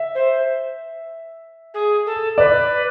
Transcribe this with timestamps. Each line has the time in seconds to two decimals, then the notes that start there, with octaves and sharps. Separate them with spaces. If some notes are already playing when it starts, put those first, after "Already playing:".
Already playing: E5
0.14 C5
1.74 G#4
2.06 A4
2.38 B4 D5